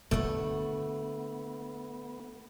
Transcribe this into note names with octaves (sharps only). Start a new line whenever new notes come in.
D3 A3 B3 D4 F#4